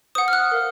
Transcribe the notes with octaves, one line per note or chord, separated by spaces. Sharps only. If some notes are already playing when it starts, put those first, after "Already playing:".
C5 F#5 D#6
F6
F#6
A#4 F5